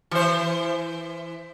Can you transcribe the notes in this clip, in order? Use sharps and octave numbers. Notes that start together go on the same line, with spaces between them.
E3 C5